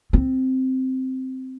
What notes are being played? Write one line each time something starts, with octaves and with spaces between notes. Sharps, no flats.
C4